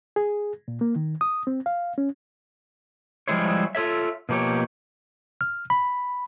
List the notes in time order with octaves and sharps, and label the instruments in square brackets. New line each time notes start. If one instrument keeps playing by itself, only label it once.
[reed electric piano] G#4
A#2
A#3
D#3
D#6
C4
F5
C#4
[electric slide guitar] F3 G3 G#3 E4 C5 C#5
F4 A4 C#5 E5
B2 F3 A#3 G4 C#5
[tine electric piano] F6
B5